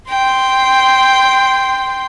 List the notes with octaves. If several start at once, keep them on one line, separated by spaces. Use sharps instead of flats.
G5 C6